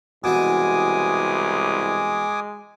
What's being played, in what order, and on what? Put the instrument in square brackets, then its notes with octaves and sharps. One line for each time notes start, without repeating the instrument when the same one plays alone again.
[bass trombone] C2 [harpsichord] B2 E3 [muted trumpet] G#3 [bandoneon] G#5 D6 D#6